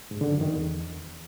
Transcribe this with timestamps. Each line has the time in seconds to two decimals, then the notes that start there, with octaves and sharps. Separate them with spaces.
0.11 G#2
0.21 D3
0.31 F#2
0.41 D#3
0.51 E2